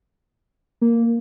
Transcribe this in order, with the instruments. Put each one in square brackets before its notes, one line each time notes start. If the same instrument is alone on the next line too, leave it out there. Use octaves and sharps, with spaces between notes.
[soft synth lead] A#3